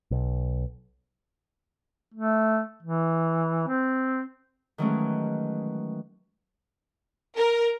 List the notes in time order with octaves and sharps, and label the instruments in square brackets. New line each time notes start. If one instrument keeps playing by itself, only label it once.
[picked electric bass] B1
[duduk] A3
E3
C4
[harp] D#3 E3 F#3 G#3 A3 C#4
[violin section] A#4